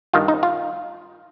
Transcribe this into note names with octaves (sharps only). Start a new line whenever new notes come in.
G2 D#3 F4
D#4
F4